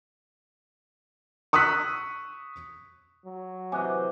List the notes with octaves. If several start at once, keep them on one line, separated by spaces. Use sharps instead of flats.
C#6 D#6 E6 F#6 B6
F#3
C3 E3 D#5 G#5 D6 F#6